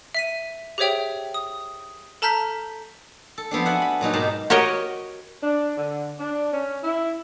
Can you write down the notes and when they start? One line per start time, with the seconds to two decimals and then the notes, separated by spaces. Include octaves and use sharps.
0.15 E5 B6 D#7
0.78 G4 G#4 C5 C#5 E5 G5
1.34 D#6
2.22 A4 A5 A#5 F6 G6 B6
3.38 A4
3.51 F3 B3 C4 D4
3.65 F#4 E5 F#5 G#5
3.82 B5
4.01 A#2 F#3 D#4 B4
4.13 G#2 B2 G4 A#4 A5 B5
4.50 F#4 G4 A#4 C#5 D#5
5.43 D4
5.77 D3
6.19 D4
6.53 C#4
6.83 E4